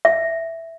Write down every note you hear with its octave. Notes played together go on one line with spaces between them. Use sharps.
E5